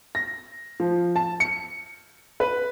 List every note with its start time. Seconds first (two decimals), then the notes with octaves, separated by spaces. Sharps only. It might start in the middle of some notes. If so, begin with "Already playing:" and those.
0.15 A#6
0.80 F3
1.16 A5
1.40 C#7
2.40 B4